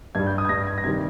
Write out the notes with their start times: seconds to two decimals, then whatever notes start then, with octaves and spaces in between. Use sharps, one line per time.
0.15 G2 G3 G#6
0.27 G6
0.38 D#6
0.45 G#6
0.49 G2 G3 A#6
0.67 G#6
0.78 A#6
0.84 C3 D#3 G3 G#6